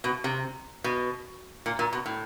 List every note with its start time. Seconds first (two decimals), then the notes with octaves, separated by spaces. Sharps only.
0.04 B2
0.24 C3
0.84 B2
1.66 A#2
1.79 A#2
1.93 B2
2.06 A2